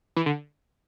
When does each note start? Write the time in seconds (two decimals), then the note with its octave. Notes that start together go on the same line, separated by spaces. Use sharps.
0.17 E3
0.26 D3